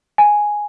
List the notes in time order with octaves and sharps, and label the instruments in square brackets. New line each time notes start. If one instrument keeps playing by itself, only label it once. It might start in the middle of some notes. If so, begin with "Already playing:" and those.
[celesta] G#5